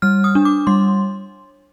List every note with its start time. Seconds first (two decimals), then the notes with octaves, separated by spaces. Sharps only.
0.02 G3 F6
0.24 D#6
0.35 D4
0.45 D6
0.67 G3 C6